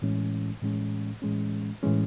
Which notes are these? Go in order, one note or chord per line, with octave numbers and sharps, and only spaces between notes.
A2 E3 G#3 C#4
A2 E3 G#3 C#4
A2 E3 G#3 C#4
A2 E3 G#3 C#4